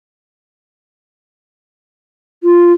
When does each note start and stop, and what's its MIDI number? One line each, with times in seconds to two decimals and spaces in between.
2.43 2.72 65